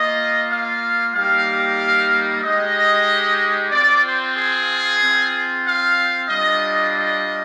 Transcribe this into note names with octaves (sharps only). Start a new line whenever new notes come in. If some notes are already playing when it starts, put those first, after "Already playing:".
Already playing: A#3 F4 D#5
F5
G3 A#3 D#4 G4 F5
G#3 D#4 G4 D#5
C4 F4 D5
C5
G#4
C4
F4
F5
G3 D4 F4 D#5
D#5